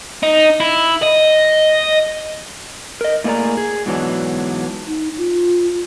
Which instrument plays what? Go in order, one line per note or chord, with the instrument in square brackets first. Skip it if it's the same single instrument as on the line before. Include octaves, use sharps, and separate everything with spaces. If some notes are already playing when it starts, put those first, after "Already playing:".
[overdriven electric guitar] D#4
E4
D#5
[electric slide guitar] A#4 D#5
A2 A#3 G#4 A#4 D5 A#5
G#4
G#2 B2 E3 F#3 D4
[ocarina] D#4
F4